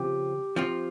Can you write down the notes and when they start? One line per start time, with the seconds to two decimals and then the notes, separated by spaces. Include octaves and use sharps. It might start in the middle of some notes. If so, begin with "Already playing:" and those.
Already playing: C#3 F3 C4 F4 G4
0.56 F3 C4 F4